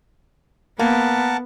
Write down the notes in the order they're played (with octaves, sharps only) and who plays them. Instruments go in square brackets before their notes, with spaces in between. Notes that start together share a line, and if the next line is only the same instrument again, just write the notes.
[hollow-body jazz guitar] A#3 [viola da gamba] B3 [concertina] A#4 F#5 A5